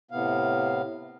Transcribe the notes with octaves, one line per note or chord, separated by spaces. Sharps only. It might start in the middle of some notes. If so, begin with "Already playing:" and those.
A2 C3 B3 F5